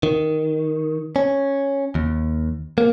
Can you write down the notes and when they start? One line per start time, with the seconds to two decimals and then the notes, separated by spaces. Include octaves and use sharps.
0.03 D#3
1.16 C#4
1.95 D#2
2.78 A#3